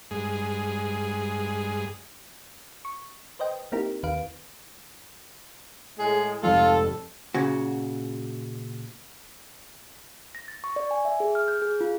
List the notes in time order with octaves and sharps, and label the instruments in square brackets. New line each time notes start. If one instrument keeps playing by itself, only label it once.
[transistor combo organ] G2 G#3 G#4
[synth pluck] C#6
B4 C5 D#5 G5
A#3 C4 D#4 E4 G4 A#4
D#2 D#3 B4 F5 D7
[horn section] A2 G#3 [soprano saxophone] G#4
[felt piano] F1 F2 G#2 [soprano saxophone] F4 [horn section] A4
[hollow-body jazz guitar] A#2 C#3 F#4
[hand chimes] A#6
A6
C#6
D5
G#5
E5
G#4
F6
G6
G#4
F4